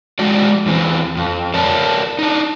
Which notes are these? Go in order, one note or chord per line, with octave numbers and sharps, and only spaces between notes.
F3 G#3 F#4 D5
E2 E3 C4
F2
A#4 C#5 D5 A5
D4 D#4